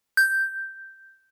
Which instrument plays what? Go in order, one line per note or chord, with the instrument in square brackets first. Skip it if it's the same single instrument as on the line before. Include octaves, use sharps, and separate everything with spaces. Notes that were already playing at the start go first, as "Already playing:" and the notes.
[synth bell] G6